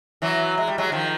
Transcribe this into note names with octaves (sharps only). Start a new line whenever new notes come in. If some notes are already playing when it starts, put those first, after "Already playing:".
E3 F#3
G#3
G3
F#3 G#3
D#3 F3